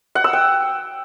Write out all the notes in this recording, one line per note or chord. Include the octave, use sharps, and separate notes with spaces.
F#5
E6
G5